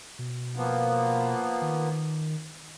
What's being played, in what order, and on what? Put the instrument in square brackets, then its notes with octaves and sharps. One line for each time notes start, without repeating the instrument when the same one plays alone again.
[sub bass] B2
[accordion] F3 A#3 B3
[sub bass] D#3